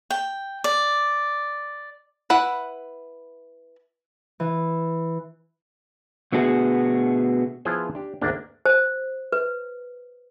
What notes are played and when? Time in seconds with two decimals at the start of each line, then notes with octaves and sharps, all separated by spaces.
0.11 G5
0.64 D5
2.30 E4 B4 F#5
4.40 E3
6.32 B2 D3 A3 B3 F#4 G#4
7.65 F3 B3 E4 F4 G#4 C5
7.95 D4 G4
8.22 G#1 D2 A#3 D4
8.65 C5
9.32 B4